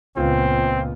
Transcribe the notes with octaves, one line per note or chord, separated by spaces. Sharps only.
C#2 A#2 B3 C4 F4